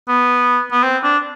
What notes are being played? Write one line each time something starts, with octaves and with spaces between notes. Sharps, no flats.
B3
B3
C4
D4